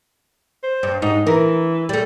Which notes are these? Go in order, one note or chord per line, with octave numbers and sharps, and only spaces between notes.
C5
G2
G#2 D#4
E3 A#4
G3 A3